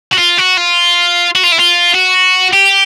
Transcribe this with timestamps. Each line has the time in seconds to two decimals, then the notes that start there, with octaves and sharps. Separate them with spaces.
0.13 F#4
0.19 F4
0.38 F#4
0.58 F4
1.36 F#4
1.44 F4
1.52 E4
1.60 F4
1.95 F#4
2.53 G4